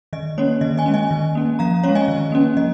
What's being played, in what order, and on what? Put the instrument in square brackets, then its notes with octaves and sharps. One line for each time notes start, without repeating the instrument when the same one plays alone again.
[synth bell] D#3 D#5
A#3 C#4 C#5
D#3 D#5
D#5 G#5
G#3 C#4
D#5 G#5
D#3
A#3 C#4
F3 F5 A#5
G#3 C#4 C#5 F5
D#5 G#5
D#3
A#3 C#4
F3 D#5